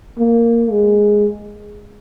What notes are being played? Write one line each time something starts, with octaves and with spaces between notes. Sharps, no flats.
A#3
G#3